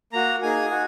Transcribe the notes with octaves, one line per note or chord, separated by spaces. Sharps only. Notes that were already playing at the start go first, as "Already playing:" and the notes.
A#3 F#4 A#5
A#3 D#4 G#4 G#5
F#4